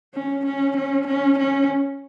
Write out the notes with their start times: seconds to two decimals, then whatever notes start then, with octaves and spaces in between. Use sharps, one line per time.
0.14 C#4
0.46 C#4
0.77 C#4
1.07 C#4
1.38 C#4